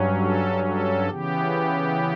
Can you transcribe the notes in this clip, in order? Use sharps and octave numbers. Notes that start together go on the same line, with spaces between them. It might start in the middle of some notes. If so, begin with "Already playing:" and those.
Already playing: G2 F#3 C#4
A4
A4
C#3 E3 B3 G4